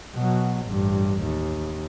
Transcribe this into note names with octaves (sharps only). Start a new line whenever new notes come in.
B2 F#3
A1 G2
D#2